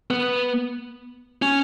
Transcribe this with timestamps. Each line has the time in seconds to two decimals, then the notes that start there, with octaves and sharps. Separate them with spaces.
0.10 B3
1.42 C#4